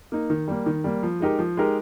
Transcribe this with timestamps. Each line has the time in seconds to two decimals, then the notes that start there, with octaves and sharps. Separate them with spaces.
0.12 A#3 D#4
0.30 D#3
0.48 G3 A#3
0.66 D#3
0.84 G3 A#3
1.03 F3
1.20 G#3 D#4 G4 A#4
1.39 F3
1.57 G#3 D#4 G4 A#4